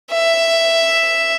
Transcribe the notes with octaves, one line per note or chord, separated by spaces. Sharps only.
E5